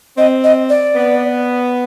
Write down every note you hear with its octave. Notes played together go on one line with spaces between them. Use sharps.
C4 D#5
D#5
D5
B3